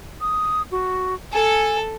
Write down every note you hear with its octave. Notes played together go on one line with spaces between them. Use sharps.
D#6
F#4
A4 G#5